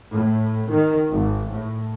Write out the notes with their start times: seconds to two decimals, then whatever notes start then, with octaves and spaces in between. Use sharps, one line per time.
0.12 A2
0.72 D#3
1.10 G#1
1.51 A2